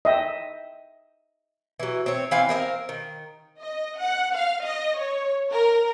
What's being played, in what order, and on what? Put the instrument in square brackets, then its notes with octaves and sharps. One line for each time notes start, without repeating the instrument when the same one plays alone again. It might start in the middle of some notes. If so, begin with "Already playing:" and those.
[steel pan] D#5 E5 G5
[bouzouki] E3 F#3
C4 C#5
E3 C4 F5 G#5
C4 A#4 D#5 F5
D#3
[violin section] D#5
F#5
F5
D#5
C#5
A#4